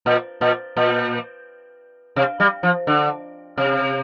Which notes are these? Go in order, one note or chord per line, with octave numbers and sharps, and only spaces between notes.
A#2
A#2
A#2
C3
G3
F3
D3
C3